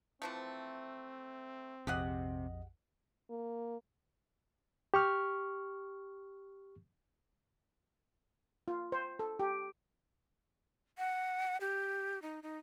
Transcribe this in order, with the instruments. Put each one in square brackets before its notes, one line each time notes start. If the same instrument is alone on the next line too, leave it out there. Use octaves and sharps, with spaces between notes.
[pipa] E3 F3 A3 [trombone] C4
[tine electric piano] A#1 F2 D#5 [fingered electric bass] C3 [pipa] G4 G#4 F#5
[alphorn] A#3
[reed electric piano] G4 C#6 F6
[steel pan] F4
C5
A4
G4
[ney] F#5
G4
D#4
D#4